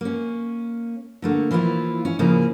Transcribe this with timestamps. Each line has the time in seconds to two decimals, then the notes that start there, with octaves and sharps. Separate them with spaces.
0.01 A#3 C#4
1.22 D3 A3 A#3
1.51 E3 F3 A#3 E4 F4
2.05 C#4
2.19 A2 C#3 F3 A#3 E4 G#4